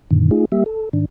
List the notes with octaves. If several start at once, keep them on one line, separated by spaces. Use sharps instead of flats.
F#2 A#2 D3 D#3
A3 D#4 F4 G#4
G3 A#3 G4 E5
A4
G#2 D#3 D4